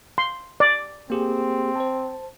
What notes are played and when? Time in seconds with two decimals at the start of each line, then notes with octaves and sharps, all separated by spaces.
0.18 C6
0.60 D5
1.10 A#3 C4 G4 G#4
1.76 C5 A5